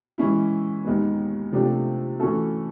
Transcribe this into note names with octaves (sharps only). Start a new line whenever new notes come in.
E3 G#3 C#4 E4
D#2 D#3 G#3 B3
C3 F3 A3 D4 G4
E3 A3 C#4 F#4 A4